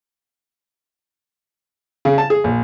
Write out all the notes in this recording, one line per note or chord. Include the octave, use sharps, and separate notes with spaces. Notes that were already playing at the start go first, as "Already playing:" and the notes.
C#3
A5
G#4
A#1